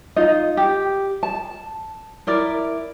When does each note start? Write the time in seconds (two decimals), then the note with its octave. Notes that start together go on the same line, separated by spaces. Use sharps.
0.16 D#4 F4 D#5
0.57 G4
1.23 A5
2.27 E4 A#4 D5